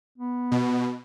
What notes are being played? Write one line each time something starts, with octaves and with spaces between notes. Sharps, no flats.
B3
B2